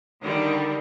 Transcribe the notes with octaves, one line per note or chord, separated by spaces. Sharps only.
D3 D#3 G3